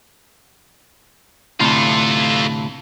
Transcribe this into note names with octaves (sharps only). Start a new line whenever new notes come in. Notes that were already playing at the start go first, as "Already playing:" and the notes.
D2 A2 C3 F4 A4